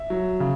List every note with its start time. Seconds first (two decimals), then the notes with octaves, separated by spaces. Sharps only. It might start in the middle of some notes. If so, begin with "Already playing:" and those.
Already playing: E5
0.10 F#3
0.40 C#3